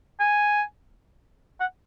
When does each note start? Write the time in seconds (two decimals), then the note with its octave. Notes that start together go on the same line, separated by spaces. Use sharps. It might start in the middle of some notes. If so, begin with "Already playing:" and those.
0.20 G#5
1.60 F#5